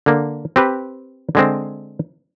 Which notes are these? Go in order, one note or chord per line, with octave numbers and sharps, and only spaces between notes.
D3 A#3
C4 G4 B4
D3 G#3 C4